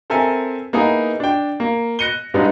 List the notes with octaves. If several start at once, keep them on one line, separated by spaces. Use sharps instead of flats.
C4 A4 A#4 E5 G#5
A#3 B3 D#4 E4 G#4
D4 G5
A#3
F#6 A#6 C#7 D#7 G7
G2 G#3 B3 D4 D#4